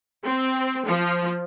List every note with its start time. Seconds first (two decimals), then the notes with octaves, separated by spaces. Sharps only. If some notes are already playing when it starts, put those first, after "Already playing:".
0.25 C4
0.87 F3